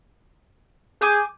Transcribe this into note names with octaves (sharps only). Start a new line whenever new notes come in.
G#4 G#5 D6 G6